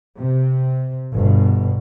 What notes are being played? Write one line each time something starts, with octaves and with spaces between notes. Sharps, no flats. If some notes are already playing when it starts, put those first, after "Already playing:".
C3
G1 B2